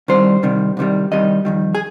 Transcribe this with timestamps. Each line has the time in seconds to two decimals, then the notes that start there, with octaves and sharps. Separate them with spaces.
0.08 C2 C3 D#3 G3 C5
0.43 C2 C3 D#3 G3
0.77 C2 C3 D#3 G3
1.11 C2 C3 D#3 G3 D#5
1.45 F2 D#3 G3
1.75 G#4